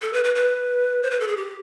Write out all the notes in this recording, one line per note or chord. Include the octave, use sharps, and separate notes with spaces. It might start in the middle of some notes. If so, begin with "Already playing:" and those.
A4
B4
B4
B4
C5
B4
A4
G#4
G4